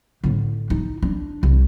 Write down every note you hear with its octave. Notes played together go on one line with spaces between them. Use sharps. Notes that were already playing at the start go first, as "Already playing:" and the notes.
A2 D3
D#4
D4
C2